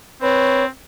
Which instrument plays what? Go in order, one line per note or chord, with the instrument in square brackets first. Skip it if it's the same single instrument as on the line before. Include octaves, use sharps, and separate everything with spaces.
[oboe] C4 [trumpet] B4 [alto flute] C#5